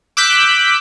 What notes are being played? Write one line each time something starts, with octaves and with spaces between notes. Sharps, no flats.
D6 E6 F#6 G6 B6